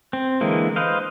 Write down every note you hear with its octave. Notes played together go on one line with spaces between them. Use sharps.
C4
D3 E3 G#3 A#3
B4 C5 D#5 F5